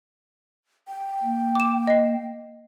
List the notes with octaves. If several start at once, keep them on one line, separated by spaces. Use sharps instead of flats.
G5
A#3
D6 E7
D#5 C7